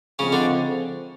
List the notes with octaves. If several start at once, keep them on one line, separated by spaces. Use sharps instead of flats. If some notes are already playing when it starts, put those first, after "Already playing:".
C#3 F3 G#3 C4 C#4
D3 D4